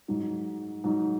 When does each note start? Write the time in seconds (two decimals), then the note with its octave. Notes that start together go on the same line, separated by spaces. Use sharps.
0.08 G#2 F#3 D#4
0.84 G#2 F#3 D#4